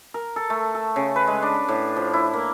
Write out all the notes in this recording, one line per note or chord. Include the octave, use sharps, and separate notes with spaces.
A#4
A4
A3
A4
C#3
B4
G#3
D4
A2
F3
E4
A#3